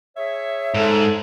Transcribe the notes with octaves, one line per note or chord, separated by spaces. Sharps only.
G#4 C#5 E5
G#2 A4